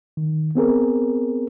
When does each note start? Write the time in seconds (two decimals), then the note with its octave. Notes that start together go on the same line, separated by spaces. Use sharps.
0.17 D#3
0.55 B3 C4 G#4 A#4